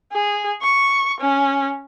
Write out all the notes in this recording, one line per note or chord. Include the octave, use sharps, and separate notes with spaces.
G#4
C#6
C#4